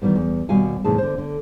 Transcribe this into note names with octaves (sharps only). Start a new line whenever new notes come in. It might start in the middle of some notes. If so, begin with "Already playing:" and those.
D#3 E3 F#3 G3 B3
E2
D#2 B2 G3 F#4 F5 G#5
E2 A2 C3 D#4 G#4 A5
D3 C5
D3